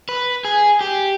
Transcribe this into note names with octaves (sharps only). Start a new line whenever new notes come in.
B4
G#4
G4